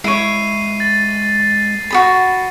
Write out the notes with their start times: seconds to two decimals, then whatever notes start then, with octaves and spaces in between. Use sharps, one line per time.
0.04 G#3 E4 C#5 C7 D#7
0.80 A6
1.91 F#4 G#4 B5